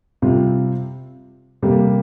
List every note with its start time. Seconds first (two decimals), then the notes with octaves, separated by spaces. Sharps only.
0.22 C3 G3 C4 F4
1.62 C3 G3 A#3